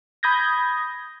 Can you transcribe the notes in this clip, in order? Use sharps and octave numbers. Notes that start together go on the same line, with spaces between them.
B5 D#6 G6 G#6 A#6